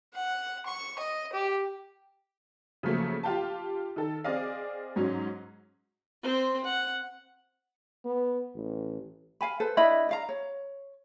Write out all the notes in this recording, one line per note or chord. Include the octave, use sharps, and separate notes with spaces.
F#5
C#6
D#5
G4
C#3 F3 F#3 A3 A#3
F4 G4 F5 G5 A5
D#3 A4
C4 G#4 D5 D#5 F5
G#2 F#3 C#4
C4 C5
F#5
B3
A1
F5 G#5 B5
A4 B4 C5
D4 E4 D#5 B5
D5 F5 A#5
C#5